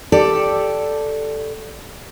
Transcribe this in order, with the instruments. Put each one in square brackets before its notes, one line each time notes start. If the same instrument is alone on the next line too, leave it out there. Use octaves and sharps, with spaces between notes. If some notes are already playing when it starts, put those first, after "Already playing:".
[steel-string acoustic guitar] G4 A4 D5